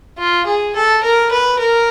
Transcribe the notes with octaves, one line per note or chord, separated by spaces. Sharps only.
F4
G#4
A4
A#4
B4
A#4